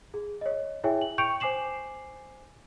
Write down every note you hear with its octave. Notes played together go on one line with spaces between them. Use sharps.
G#4
C#5 D#5
E4 G#4 C#5 E5 G5 G#5
F#7
G5 C#6 G6 C#7 D7 F7
C5 G#5 D6 C7 E7 F#7